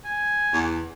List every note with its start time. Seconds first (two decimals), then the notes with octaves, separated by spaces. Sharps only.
0.05 G#5
0.53 E2